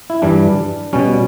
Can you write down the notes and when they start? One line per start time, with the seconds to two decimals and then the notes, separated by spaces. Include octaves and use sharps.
0.10 E4
0.22 G2 E3 G3 D4
0.93 B2 G3 C#4